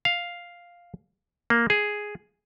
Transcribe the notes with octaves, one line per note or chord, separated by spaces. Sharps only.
F5
A#3
G#4